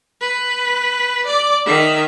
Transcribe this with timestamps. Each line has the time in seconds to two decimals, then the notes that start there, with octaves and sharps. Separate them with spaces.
0.21 B4
1.26 D5 D6
1.66 D#3 E5